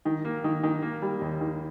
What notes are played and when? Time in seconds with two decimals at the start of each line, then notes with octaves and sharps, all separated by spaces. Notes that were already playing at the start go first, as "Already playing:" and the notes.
0.05 D#3
0.25 A#3
0.44 D#3
0.63 D#3
0.82 A#3
1.02 G3
1.21 D#2
1.41 D#3